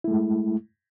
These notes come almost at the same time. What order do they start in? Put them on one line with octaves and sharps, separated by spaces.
E4 A3 G#3